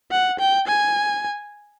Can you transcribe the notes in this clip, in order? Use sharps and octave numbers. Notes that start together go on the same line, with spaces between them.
F#5
G5
G#5